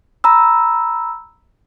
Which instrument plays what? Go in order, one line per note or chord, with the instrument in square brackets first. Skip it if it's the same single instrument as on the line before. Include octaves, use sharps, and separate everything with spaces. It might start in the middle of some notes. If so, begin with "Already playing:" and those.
[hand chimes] A#5 B5 E6